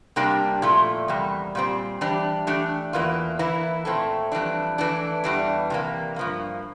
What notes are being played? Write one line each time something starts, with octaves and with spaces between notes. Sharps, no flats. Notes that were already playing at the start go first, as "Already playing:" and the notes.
C3 G3 A#3 D4 G4
A#2 F3 A3 E4
E2 C3 G3 A#3
A#2 G3 C4
E3 G3 D4 G4
E3 A3 D4 G4
E2 E3 A#3 F4
E3 A#3 E4
A#2 A3 C4 E4 A4
F2 E3 G3 D4
E3 A3 D4
E2 E3 G3 D4
C3 E3 A#3
G2 F3 A#3